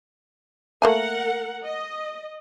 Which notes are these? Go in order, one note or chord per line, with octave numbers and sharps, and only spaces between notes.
A3 A#3 A#4 F#5 G#5
D#5